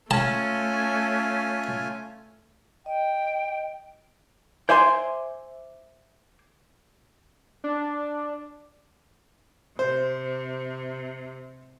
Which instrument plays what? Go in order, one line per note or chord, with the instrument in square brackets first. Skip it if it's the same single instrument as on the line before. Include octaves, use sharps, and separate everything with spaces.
[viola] A3 [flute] C#4 [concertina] F4 G#5 [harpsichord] A5
[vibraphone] D#5 [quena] G5
[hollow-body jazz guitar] C5 D5 E5 G#5 C6
[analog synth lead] D4
[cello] C3 [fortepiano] C5